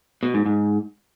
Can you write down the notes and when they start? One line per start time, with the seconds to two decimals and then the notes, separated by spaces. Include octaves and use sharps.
0.23 B2
0.34 G#2
0.46 G#2